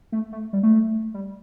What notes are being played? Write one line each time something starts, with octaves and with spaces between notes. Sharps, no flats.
A3
A3
G3
A3
G3